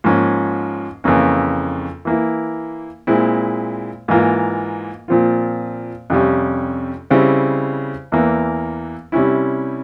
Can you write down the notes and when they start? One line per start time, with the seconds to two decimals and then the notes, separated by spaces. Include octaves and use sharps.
0.04 G#2 F3 A#3 C#4
1.04 F2 C#3 E3 A#3 C#4
2.05 E3 A#3 E4
3.07 A#2 G#3 C4 E4
4.08 G#2 E3 A#3 F4
5.08 A#2 F3 C4 F4
6.10 F2 C3 G3 C#4
7.10 C#3 G3 C4 E4
8.12 E2 E3 A#3
9.12 C3 G3 C#4 E4